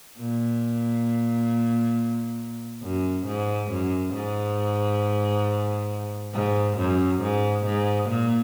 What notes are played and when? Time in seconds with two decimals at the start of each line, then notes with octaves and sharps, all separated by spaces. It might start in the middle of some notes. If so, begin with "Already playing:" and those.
0.19 A#2
2.83 F#2
3.27 G#2
3.71 F#2
4.14 G#2
6.35 G#2
6.78 F#2
7.22 G#2
7.66 G#2
8.10 A#2